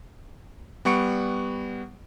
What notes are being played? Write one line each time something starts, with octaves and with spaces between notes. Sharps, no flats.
G3 B3 F#5 C#6 C#7 D7